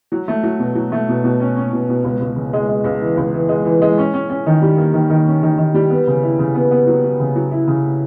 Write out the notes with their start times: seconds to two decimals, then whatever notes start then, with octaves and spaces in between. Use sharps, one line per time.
0.12 F#3
0.28 A3
0.43 F#3
0.59 B2
0.75 F#3
0.92 A3
1.08 B2
1.24 B2
1.40 C#4
1.57 C#4
1.73 B2
1.89 B2
2.04 C#2
2.20 C#2
2.36 C#3
2.53 G#3
2.68 G#3
2.84 C#2
3.01 E3
3.17 C#2
3.34 E3
3.49 G#3
3.65 E3
3.82 G#3
3.98 C#4
4.14 C#4
4.30 C#4
4.46 D#3
4.62 G3
4.77 A#3
4.94 D#3
5.10 D#3
5.27 C#4
5.43 D#3
5.58 D#3
5.74 G3
5.90 B3
6.07 C#3
6.23 E4
6.39 C#3
6.54 B3
6.71 B3
6.87 F#3
7.03 F#3
7.20 C#3
7.36 F#3
7.52 E4
7.67 C#3